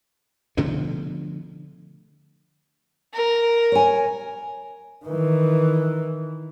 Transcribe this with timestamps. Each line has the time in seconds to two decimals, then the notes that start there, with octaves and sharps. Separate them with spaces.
0.57 B2 D3 F3 A3
3.14 A#4
3.72 C#5 G#5
5.05 D#3 E3